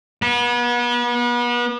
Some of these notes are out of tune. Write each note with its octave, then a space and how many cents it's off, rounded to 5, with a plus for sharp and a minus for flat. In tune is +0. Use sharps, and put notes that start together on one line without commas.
B3 -35